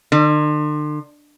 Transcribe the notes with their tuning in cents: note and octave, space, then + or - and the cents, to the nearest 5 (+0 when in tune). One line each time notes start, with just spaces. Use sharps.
D3 +40